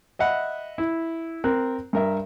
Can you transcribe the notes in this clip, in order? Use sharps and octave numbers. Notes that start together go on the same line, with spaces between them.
D#5 E5 F#5 B5
E4
C4 A#4 F#6
G2 A#4 E5